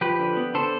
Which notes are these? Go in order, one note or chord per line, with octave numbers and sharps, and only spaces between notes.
F3 G4 B4
D3
B3
D3 A4 C5